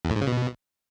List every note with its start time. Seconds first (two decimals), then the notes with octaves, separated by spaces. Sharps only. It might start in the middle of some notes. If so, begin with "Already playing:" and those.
0.05 E2
0.10 A2
0.16 G#2
0.21 C#3
0.27 B2